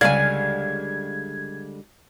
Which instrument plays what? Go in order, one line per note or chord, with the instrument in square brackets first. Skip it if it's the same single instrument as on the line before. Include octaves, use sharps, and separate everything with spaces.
[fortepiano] C#2 F5 [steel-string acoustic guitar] D3 G3 G#3 [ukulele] D5 G#5 [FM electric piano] G#6